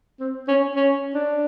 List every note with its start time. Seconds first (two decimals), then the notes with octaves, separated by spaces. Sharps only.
0.20 C4
0.48 C#4
0.75 C#4
1.15 D4